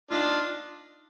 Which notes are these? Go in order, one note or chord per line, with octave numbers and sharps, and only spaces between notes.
D4 D#4 F4